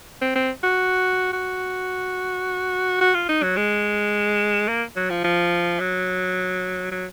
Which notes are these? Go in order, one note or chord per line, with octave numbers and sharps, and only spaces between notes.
C4
C4
F#4
F#4
F#4
F4
D#4
F#3
G#3
A#3
F#3
F3
F3
F#3
F#3